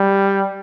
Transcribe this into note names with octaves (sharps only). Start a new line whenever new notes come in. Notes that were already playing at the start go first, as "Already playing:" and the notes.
Already playing: G3